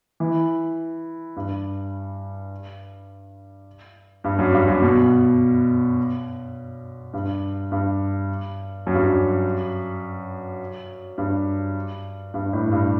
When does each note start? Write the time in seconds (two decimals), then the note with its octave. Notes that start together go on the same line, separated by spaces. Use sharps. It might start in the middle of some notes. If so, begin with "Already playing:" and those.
0.20 E3
1.36 G2
4.24 G2
4.39 F#2
4.53 G2
4.68 F#2
4.82 B2
7.13 G2
7.72 G2
8.87 F#2
8.94 G2
9.01 F#2
11.18 G2
12.34 G2
12.53 A2
12.71 G2